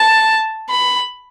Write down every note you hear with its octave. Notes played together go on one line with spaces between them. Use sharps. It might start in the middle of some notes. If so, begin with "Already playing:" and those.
Already playing: A5
B5